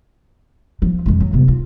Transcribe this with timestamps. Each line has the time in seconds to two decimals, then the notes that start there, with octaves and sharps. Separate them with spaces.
0.82 F3
1.06 F2 G#3
1.21 F#3
1.33 C3 B3
1.48 F4